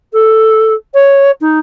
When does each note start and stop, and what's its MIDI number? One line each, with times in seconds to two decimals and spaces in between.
0.13 0.74 69
0.94 1.31 73
1.41 1.59 63